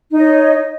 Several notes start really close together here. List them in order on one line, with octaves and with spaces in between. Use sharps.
D#4 D#5 C#5